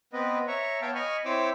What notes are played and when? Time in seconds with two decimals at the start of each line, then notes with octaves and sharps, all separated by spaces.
0.13 B3 C4 B4 D#5
0.48 C#5 E5 A#5 C#6
0.82 B3 C#5 F5 G5 A5
0.95 D#5 G#5 B5 C#6 F6
1.25 C4 E4 C5 C#5 D6 E6